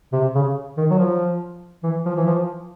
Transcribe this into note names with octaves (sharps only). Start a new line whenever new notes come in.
C3
C#3
D#3
F#3
F3
E3
F3
E3
F3